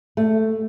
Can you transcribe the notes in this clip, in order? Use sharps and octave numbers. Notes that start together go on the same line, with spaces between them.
A3